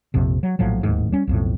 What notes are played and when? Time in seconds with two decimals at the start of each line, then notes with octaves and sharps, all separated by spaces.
0.14 A#1 F2 C3
0.43 F#3
0.59 A#1 A2 F3 F#3
0.83 D1 D#2 G#2
1.12 G3 C#4
1.27 B1 F2 A2